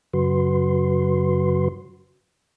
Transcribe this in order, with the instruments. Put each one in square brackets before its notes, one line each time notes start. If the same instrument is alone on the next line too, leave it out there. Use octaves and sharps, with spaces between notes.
[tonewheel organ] F#2 C#3 F#3 F#4 B4 C6